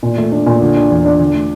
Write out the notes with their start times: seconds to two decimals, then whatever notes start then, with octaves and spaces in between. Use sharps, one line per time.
0.03 A#2
0.18 A3
0.32 D4
0.46 A#2
0.61 D3
0.76 D4
0.90 E2
1.05 D4
1.19 D3
1.34 A3